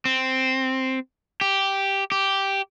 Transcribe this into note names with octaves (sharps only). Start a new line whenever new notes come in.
C4
G4
G4